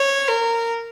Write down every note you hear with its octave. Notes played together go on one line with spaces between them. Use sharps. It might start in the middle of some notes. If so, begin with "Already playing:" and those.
Already playing: C#5
A#4